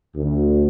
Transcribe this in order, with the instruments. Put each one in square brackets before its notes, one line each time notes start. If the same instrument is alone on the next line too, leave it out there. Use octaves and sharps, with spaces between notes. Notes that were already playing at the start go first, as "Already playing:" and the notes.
[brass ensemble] D2